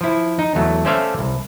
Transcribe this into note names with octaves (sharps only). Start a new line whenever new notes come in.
F3 E4
D#4
E2 F#3 A3
A3 C#4 C5 D5 E5 F5
C2